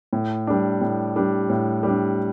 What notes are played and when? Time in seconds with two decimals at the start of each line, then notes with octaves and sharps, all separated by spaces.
0.13 A2
0.47 G3 D4
0.81 A2
1.16 G3 D4
1.49 A2
1.83 G3 D4